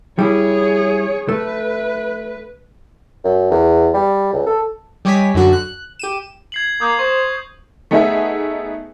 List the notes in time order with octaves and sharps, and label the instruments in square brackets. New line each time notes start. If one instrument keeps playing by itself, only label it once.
[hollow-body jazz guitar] G3 E4 [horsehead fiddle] G#4 C#5
[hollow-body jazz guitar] A3 [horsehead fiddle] B4
[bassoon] F#2
E2
G3
C#2
A4
[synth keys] G3 G4 C#5 D#5 G#5 B6
F#2 D3 F#4
F#6
G4 D#7 E7
[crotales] G#6 C7 F#7
[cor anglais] A#3 [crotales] D#6 G6
[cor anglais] C5 [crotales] C#6
[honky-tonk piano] A3 B3 D#4 G#4 E5